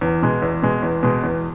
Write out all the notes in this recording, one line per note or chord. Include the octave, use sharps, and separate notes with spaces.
E2
B2 G#3
E2
B2 G#3
E2
B2 G#3
E2